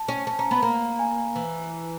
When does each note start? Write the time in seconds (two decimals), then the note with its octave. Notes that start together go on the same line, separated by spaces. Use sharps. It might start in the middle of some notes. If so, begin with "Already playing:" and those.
Already playing: A5
0.08 C#4
0.27 C#4 A5
0.39 C#4 A#5
0.51 B3 B5
0.62 A#3 A#5
0.99 G#5
1.35 E3